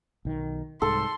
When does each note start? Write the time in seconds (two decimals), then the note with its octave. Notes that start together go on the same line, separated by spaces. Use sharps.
0.25 B1 D#3
0.82 C2 G#2 A4 C6